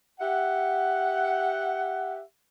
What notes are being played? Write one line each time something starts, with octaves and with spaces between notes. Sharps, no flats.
G4 E5 F#5